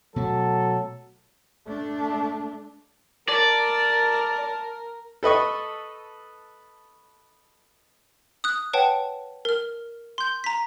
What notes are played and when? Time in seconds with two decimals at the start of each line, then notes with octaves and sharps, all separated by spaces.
0.16 B2 F#3 A3 A4
1.68 A3 D4
3.29 A#4 D5 A5
5.23 A4 B4 D#5 C#6
8.44 D#6 F#6
8.73 B4 C#5 F#5 G5 A5
9.45 A#4 F6
10.18 C6 G6
10.44 A#5 B6